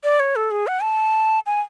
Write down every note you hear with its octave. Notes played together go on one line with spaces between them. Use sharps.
D5
C#5
A4
G#4
F#5
A5
G#5